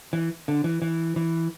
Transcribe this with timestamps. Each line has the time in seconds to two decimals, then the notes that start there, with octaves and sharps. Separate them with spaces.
0.13 E3
0.48 D3
0.64 E3
0.82 E3
1.16 E3